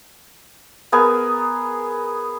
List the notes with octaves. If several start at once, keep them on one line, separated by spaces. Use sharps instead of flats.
B3 G#4 A#4 G#5